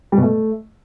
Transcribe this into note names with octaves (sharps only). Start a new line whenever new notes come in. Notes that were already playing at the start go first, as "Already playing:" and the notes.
G3
B2
A3